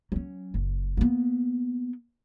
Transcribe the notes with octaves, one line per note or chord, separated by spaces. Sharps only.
F#3 C#4
F#1
A#3 B3